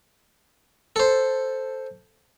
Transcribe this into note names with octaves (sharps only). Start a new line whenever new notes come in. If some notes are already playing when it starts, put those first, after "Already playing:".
A4 C5